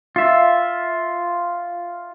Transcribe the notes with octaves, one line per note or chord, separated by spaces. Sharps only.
F4 E5